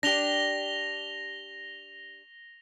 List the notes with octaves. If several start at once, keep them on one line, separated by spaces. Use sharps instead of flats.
D4 G4 A#6 F7 G7